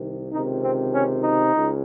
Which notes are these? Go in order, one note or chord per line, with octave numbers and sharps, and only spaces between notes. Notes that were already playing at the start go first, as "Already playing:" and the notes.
Already playing: C2 C3 D#3
C#2 C3 D#3 D#4
C4
C#4
D#4
C#2